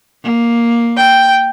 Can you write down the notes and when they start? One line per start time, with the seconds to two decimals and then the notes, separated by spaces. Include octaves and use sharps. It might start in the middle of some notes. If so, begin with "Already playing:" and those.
0.24 A#3
0.97 G5